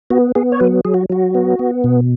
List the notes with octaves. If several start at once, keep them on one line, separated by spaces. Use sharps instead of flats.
B3 F#4
B3 G#4
C#5
F#3 B4
F#3 G#4
F#4
F#3 F#4
B3
B3
B2